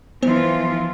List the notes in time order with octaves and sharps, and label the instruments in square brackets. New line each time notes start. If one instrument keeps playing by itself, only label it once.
[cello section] E3 F3 F4 [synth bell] B3 C5